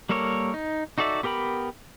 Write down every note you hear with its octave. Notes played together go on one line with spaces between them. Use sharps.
G3 A#3 A4 A#4 C#5
D#4
D#4 F#4 A4 D5 E5
B3 G4 A#4 G5 B5